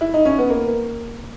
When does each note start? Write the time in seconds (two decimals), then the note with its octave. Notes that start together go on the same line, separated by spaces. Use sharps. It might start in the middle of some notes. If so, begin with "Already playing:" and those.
0.01 E4
0.14 D#4
0.25 C#4
0.38 B3
0.50 A#3